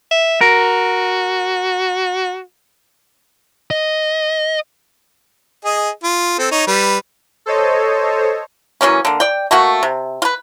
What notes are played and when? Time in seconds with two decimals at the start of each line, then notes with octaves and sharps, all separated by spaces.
0.11 E5
0.41 F#4 A#4
3.71 D#5
5.65 G#4 D#5
6.04 F4
6.39 C4 A4
6.51 D#4 C#5
6.67 G3 B4
7.46 A4 C5 C#5 D#5
8.81 E3 F#3 A#3 C#4
9.05 D3 A#3
9.20 D5 G5
9.51 A3 A#3 F#4
9.83 C3
10.22 F4 B4